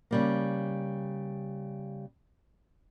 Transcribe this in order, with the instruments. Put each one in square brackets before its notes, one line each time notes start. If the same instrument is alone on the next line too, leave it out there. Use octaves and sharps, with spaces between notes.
[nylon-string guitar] C#3 G3 A#3